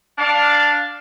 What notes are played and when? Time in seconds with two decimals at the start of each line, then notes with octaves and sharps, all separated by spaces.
0.18 D4 F5